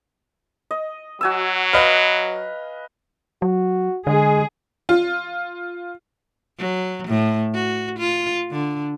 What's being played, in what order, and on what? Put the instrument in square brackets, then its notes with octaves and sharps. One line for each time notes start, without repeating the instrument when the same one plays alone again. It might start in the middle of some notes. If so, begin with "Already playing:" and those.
[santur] D#5
[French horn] F#3 [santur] F#4 G#5 E6
[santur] B4 F5 [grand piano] D#5 F6
[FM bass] F#3 [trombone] F#4
[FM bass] D3 [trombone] G#3 [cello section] G#4
[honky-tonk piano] F4
[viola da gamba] F#3
A2
F#4
F4
D3